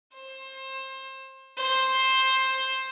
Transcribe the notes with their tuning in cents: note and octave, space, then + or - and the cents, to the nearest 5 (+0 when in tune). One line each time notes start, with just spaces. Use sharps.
C5 +25
C5 +10